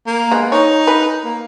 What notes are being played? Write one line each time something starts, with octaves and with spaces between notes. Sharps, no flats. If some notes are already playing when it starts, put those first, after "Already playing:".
A#3
G#3 B3
D#4 C#5
B4
A#3